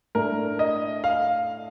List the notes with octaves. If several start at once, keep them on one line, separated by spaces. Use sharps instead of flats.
A2 A3 D4 A#4
D#5
F5